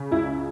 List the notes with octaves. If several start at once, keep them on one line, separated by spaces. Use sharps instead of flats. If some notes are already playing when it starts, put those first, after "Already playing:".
Already playing: C#3
C#2 E4